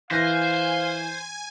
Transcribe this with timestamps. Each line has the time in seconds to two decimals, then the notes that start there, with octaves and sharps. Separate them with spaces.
0.11 E3 C5 F5 G#5 A#6